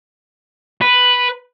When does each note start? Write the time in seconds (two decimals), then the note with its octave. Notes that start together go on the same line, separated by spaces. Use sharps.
0.82 B4